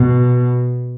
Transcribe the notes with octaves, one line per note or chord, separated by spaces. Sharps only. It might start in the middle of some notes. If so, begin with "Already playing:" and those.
Already playing: B2